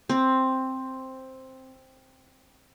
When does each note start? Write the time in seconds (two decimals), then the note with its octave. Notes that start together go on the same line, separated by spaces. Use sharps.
0.09 C4